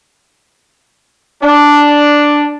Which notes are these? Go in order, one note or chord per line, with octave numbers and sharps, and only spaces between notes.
D4